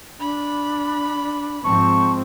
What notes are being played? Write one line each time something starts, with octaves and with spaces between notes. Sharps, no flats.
D4 B5
G#2 F3 C4 A5 C#6